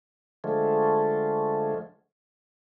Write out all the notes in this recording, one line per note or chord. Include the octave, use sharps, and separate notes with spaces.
D3 F3 G#3 A3